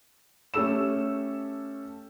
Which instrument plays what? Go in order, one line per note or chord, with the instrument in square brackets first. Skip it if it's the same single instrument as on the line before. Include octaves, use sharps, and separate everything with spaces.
[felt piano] A3 C#4 G4 A4 E6 E7